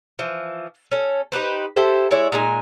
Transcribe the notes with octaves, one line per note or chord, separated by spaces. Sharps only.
E3 F3
C#4 A4
D#4 G4 B4 C5
E4 G4 A4 C5
G#3 E4 C#5 D5
A#2 G#3 D#4 G#5